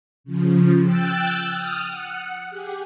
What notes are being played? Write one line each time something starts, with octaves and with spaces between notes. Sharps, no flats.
C#3 F3
G5 E6 F#6 A6
D#6 F6
F#5
G4 G#4